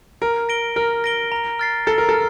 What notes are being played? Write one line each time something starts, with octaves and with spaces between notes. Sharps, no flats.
A#4 F6
A#6 D7 G7
A#4 F6
A#6 D7 G7
A#5
F6 A6 C7
A4 A#5
A#4
A4
F6